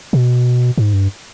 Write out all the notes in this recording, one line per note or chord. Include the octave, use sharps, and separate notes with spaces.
B2
G#2
G2